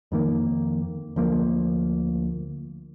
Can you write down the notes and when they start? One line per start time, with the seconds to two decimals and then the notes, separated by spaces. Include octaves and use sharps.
0.12 F2 D#3 A#3
1.16 D2 F3 A#3